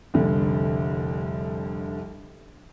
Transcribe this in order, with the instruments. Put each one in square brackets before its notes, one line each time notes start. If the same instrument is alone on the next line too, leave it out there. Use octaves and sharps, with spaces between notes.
[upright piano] F1 C2 D3